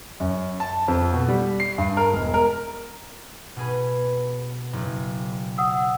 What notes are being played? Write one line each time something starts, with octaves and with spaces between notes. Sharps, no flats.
F#2
A5
F2
B2
G3
C7
G2
A#4
E1
A#4
B2 G#4 B4
F#1
F#5 D#6 E6